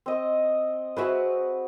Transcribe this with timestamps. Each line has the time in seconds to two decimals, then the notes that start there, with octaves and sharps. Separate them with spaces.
0.06 C4 D#5
0.97 C4 F#4 G#4 B4 E5